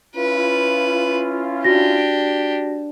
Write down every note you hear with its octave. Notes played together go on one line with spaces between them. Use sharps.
C#4 E4 F4 B4
D4 F#4 G4 A#6